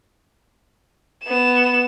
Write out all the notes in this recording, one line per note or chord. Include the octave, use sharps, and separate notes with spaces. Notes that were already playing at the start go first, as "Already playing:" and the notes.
B3 E7